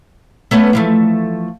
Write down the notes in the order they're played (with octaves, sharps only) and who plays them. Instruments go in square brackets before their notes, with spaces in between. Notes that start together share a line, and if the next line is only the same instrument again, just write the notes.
[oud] A3 B3 C#4
E3 F3 A3